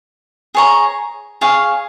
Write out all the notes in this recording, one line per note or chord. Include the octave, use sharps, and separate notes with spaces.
G#4 C#5 A#5
G#4 C#5 F5